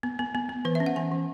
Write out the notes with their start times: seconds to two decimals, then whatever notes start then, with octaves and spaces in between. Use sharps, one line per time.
0.03 B3
0.19 B3
0.35 B3
0.49 B3
0.65 E3 B4
0.75 E5
0.80 C#4
0.86 F#5
0.96 E3 G#5
1.12 E3